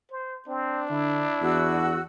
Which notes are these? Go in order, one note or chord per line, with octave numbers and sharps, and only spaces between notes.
C5
C4 D4
D3 E4
E2 F#4 E6